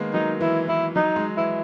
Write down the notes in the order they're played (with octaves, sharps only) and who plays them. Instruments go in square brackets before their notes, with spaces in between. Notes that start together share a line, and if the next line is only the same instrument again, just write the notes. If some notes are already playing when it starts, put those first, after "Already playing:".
Already playing: [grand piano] D#3 G#3 A#3 B3
[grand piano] F#3 [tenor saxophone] D#4
[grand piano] E3 [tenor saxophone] E4
[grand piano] E3 [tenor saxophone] E4
[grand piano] F#3 [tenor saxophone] D#4
[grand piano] G#3
[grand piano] E3 [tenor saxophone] E4